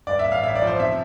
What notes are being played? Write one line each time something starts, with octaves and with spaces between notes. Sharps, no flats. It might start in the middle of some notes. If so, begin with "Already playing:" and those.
G2 D5
E5
A1
F5
A1 E5
D5
F3
C5
C3 E5